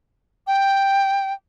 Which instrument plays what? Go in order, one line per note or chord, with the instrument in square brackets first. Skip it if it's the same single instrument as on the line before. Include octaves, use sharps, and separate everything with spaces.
[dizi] G5